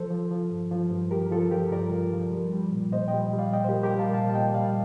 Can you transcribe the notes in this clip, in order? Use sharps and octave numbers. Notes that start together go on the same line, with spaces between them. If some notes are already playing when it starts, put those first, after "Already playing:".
Already playing: F3 A4 C5
F3
F3
G2
F3
G2
F3 G4 A#4
F3 F4 A4
F3 G4 A#4
G2 A#4 D5
F3
F3
G3
G3
A#2
A#2 C5 D#5
D#5 G5
G3
G3
D5 F5
A#2 D#5 G5
C5
G4 A#4
G3
G4 A#4
G3
F5 A5
A#2 F5 A5
A5
A#2 D#5 G5
G3 D5 F5